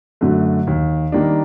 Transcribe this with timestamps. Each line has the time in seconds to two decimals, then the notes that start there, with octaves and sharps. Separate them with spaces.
0.21 F#2 D3 F#3 A3
0.67 D#2
1.12 D#3 G3 A#3 D4